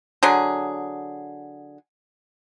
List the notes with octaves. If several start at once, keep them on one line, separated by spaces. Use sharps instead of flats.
D3 F#3 G#4